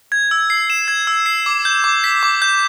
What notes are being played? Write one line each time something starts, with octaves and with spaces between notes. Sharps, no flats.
G#6
E6
C7
E7
G#6
E6
C7
D6
G6
D6
B6
D6
G6